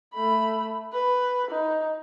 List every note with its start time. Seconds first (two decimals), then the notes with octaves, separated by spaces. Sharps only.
0.14 A3 B5
0.92 B4
1.51 D#4